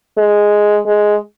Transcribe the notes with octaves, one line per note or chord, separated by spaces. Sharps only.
G#3
G#3